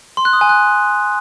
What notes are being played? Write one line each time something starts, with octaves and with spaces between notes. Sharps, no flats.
C6
F#6
D#6
G#5
F#6